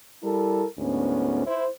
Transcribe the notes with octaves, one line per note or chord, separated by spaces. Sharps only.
G3 E4 A4 A#4
D2 G#2 B3 C#4
E4 C5